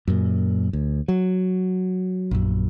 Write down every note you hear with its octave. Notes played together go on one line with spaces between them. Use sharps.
F#2 A#2
D2
F#3
A#1 F#2